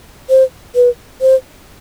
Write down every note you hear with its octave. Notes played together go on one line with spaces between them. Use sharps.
C5
B4
C5